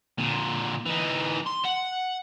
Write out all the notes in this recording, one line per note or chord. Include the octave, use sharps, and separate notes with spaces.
A#2 D3
E3 D#4
C6
F#5